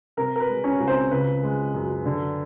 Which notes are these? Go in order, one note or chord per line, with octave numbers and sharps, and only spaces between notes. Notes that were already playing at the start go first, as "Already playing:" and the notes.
C3 A#4
A#4
B4
G#3
C#4 C#5
C#2
C4 C5
C#3 B4
G#3
F#2
D3